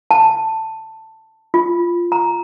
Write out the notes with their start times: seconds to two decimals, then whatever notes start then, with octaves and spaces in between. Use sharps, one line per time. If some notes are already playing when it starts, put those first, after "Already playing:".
0.11 A5
1.54 F4
2.12 A#5